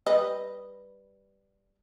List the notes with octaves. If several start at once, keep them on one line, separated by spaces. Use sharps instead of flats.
G3 B4 D#5